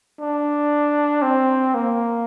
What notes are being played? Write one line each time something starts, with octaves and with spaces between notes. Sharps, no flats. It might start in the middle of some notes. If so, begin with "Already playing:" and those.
D4
C4
A#3